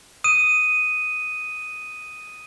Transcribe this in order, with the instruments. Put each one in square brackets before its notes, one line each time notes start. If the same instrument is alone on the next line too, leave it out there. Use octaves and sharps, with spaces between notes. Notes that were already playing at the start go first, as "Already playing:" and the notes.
[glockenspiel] D#6 D#7